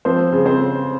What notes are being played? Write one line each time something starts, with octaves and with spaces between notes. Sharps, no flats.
F3 C4 C5
C#3
C4 C5
C#3